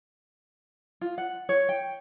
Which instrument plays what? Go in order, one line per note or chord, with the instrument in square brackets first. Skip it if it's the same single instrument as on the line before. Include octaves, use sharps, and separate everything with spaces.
[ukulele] F4
F#5
C#5
G5